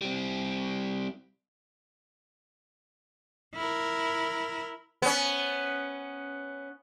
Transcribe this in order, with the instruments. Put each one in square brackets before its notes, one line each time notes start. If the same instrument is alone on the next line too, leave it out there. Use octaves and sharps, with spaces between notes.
[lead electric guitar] G3 C4
[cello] E4 A#4
[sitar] B3 C#4